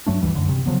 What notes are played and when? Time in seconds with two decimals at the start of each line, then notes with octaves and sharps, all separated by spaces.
0.06 G2 F#3 A3 D4
0.22 D2 E3 G3
0.35 F#2 D3
0.49 C3
0.66 C#3 F3 F#3 B3